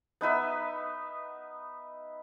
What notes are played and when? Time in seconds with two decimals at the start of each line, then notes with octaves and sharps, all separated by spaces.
0.21 B3 D#4 B4 E5